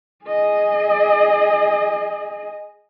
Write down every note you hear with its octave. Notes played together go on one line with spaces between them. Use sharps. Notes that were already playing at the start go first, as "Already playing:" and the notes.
G#4 D#5